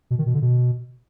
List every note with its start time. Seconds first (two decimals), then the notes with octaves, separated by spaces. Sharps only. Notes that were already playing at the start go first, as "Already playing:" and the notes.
0.11 B2
0.18 D#3
0.26 B2
0.34 D3
0.42 B2